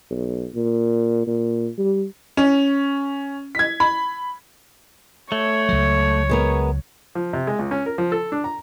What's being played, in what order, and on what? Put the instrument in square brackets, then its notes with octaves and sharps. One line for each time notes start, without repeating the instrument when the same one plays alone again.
[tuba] B1
A#2
A#2
G3
[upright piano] C#4
G#6 B6
B5
[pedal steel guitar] A3 [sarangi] C#5
[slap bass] C#2 F#3
[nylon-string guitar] G#3 B3 A#4
[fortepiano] F3
C3
G#3
C#2
C#4
A#4
F3
A4
D4
A#5